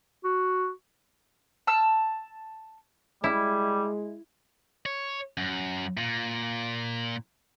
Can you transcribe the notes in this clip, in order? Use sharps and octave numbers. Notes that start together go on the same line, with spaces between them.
F#4
A5 E6
G3 G#3 E4
C#5
F#2
A#2